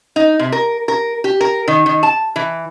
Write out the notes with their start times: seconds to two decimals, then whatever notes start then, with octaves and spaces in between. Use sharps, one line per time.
0.16 D#4
0.39 C3
0.52 A#4
0.88 A#4
1.24 G4
1.41 A#4
1.68 D#3
1.86 D#3
2.03 A5
2.36 E3